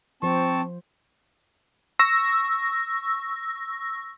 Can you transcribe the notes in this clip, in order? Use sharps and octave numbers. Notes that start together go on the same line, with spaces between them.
F3 C4 C5 A5 C#6
C#6 E6 A#6